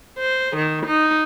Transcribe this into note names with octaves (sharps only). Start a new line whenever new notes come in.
C5
D#3
D#4